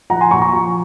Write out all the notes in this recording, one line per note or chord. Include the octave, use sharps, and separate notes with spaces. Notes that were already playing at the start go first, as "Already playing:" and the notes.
F3 F#5 A#5
G#5 C6
A#2 A#5 C#6
A#5 C#6
F3